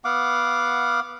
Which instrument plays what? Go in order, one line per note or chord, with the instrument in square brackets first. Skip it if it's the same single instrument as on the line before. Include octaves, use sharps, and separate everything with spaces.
[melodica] B3 F5 F#5 D6